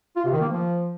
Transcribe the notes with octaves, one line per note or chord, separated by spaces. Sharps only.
F4
C3
D#3
A#3
F3